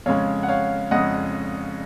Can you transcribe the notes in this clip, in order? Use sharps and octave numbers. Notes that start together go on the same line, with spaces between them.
F2 C#3 G#3 C#5 F5
F#5
C#5 F5
F2 C#3 G#3 D#5 F#5